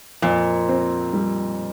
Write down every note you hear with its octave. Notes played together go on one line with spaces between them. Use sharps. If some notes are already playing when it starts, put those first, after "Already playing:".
F2 A#2
C4
G3